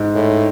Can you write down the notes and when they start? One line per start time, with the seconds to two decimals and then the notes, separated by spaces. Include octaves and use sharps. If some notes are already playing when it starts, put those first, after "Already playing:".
Already playing: G#2
0.15 A2